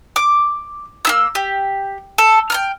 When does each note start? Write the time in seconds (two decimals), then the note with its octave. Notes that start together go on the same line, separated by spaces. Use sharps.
0.16 D6
1.05 A#3 E4 E6
1.35 G4
2.18 A4
2.50 G5 A#5 F6